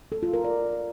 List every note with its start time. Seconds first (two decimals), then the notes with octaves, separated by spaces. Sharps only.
0.12 A4
0.23 F4
0.34 A#4
0.44 D5